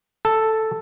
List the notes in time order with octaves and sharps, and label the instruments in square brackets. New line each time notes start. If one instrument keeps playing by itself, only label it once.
[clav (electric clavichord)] A4